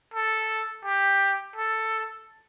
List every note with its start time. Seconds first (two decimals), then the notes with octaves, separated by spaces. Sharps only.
0.14 A4
0.85 G4
1.56 A4